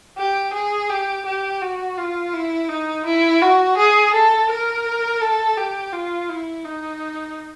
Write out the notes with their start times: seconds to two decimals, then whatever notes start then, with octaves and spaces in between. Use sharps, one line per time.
0.18 G4
0.54 G#4
0.90 G4
1.26 G4
1.62 F#4
1.98 F4
2.34 E4
2.69 D#4
3.06 E4
3.42 F#4
3.77 G#4
4.14 A4
4.50 A#4
5.21 A4
5.57 G4
5.93 F4
6.29 E4
6.65 D#4